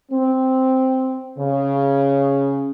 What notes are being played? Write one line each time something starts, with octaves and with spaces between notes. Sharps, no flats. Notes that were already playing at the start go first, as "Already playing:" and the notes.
C4
C#3